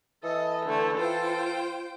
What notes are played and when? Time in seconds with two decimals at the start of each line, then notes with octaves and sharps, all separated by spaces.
0.23 E3 A4 D#5
0.65 D3 A3
0.98 F4 C5 G5